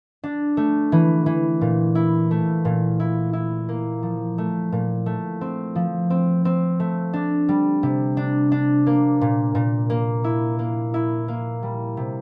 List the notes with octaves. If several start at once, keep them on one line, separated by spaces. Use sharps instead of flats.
D4
A3
E3
E3
A#2
E4
A3
A#2
E4
E4
A#3
F3
A3
A#2
A3
C4
F3
C4
C4
A3
D4
G3
C3
D4
D4
A#3
A#2
A#2
A#3
E4
A#3
E4
A#3
G3
C3